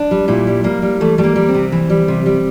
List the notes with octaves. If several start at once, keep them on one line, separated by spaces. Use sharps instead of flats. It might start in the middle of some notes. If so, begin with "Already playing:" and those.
Already playing: D4
G3
A#2 E4
G3
G3 A#3
G3
E3 A3
G3 A3
A#3
G3
C4
C3
E3
G3
C3
G3